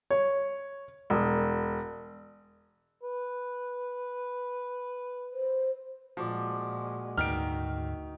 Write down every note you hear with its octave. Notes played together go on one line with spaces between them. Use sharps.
C#5
E1
B4
C5
A#2 F3 G#3 F#4 D5
D2 G#2 D#3 F6 D7